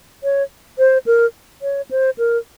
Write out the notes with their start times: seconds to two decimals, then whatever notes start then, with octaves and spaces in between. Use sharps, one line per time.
0.23 C#5
0.79 C5
1.06 A#4
1.62 C#5
1.91 C5
2.18 A#4